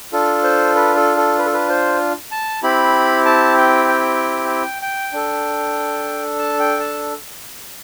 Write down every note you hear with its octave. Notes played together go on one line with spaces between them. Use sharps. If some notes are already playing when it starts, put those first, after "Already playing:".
D4 F4 A4
C5
B4
A4
A4
B4
A4
B4
C5
A5
C4 E4 G4 B5
A5
G5
G5
G5
G5
D4 A4
A5
G5
A5